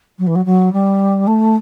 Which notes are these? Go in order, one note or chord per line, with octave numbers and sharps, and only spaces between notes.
F#3
E3
F#3
F#3
G3
A3